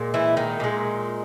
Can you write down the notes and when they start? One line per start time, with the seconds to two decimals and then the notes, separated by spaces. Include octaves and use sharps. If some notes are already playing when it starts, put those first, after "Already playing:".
Already playing: A#2 G#3
0.14 E3 E4
0.37 D#3 D#4
0.60 A#2 G#3